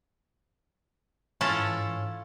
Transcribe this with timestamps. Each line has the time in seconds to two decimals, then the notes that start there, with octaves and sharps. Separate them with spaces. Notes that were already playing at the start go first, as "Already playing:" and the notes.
1.41 G#2 E3 C#4 E4 F4 A4